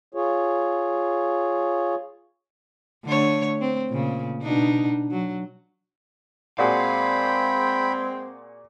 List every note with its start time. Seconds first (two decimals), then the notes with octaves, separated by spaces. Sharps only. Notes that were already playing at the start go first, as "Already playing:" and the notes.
0.15 F4 G#4 C#5
3.04 D3 A3 C#5
3.61 C4
3.89 A#2 C#3
4.42 B2 D4 D#4
5.11 F#3
6.58 A#2 G#3 C4 F#4 G#4 F5 G5 B5